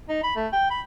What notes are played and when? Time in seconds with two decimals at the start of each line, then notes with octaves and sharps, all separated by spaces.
0.09 D#4
0.24 B5
0.36 A3
0.53 G5
0.71 B5